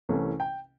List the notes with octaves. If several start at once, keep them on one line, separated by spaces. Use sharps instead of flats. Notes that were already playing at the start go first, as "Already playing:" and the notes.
C2 C3 E3 A3 C#4
G5